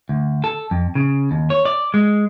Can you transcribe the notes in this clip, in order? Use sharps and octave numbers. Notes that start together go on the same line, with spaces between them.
D2
A4
F2
C#3
D#2
C#5
D5
G#3